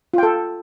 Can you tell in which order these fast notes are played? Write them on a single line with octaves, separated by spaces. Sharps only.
F4 G5 A4